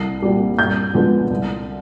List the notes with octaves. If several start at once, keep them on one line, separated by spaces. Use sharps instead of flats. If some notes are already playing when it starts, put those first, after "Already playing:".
Already playing: C2 C7
A#2 G3
G2 G6
D3 F3 G#3 B3
C2